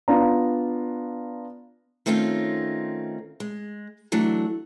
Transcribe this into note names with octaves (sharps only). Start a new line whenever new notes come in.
B3 D4 F4 D5 A#5
D#3 A3 C4 C#4 D#4 F4
G#3
E3 F#3 A3 D4